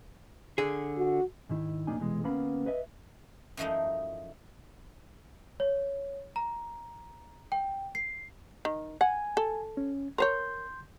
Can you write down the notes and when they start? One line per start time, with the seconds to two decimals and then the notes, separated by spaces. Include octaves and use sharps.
0.58 D3 G#4
0.97 F#4
1.50 G#2 D#3 E4
1.87 B1 F2 A#3 D4 D#4 G#5
1.99 C2 B2 E3 G#3
2.24 D2 A#3 B3 C#4 F5 B5
2.66 B4 D#5 E5
3.57 F#2 E3 F3 G#3 A3 D#4
5.60 C#5
6.36 A#5
7.52 G5
7.95 C7
8.65 D#3
9.01 F#5 G#5
9.37 A4
9.77 C#4
10.18 A#4 C5 C#5 C6 G6